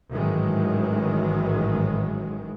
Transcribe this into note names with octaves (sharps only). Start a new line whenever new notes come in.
A1 G#2 D#3 E3 F#3 G#3